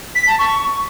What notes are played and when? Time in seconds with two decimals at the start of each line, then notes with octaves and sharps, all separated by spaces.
0.15 B6
0.27 A5
0.39 C#6